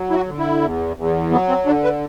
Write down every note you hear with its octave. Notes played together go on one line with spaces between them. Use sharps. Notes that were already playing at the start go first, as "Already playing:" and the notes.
Already playing: F#3
E4
F#4
D3
E4
E2
E2
F#3 B3
C4
D3 D4
B4